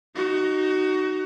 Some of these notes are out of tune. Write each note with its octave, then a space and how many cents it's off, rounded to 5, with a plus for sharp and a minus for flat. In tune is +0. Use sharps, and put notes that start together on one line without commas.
D#4 -10 F#4 +20